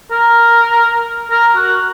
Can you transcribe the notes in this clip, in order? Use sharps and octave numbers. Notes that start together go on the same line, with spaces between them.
A#4
A#4
F#4